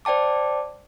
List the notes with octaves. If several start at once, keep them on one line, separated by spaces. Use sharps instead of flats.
C5 D5 G5 A5 D6